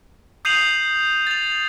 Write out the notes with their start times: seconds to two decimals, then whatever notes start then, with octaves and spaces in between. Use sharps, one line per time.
0.45 D#6 G6 C7 D#7 F7 F#7
1.27 A6 F7